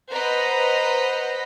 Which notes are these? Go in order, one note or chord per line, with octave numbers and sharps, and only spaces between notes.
B4 C5 D#5 F#5 A#5 B5